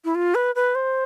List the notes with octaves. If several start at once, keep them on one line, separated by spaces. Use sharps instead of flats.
E4
F4
B4
B4
C5